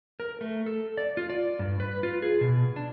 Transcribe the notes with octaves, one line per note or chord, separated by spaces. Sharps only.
A#4
A3
A4
D5
F4
D5
G2
B4
F4
G#4
B2
D4